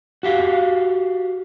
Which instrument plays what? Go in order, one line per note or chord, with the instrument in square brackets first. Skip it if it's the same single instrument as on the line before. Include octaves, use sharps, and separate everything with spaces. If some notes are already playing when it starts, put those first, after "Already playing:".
[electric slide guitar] F#4 G4 F5